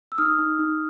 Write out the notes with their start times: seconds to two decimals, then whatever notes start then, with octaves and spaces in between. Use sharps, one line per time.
0.12 E6
0.18 D#4 D#6 F6
0.39 D#4
0.59 D#4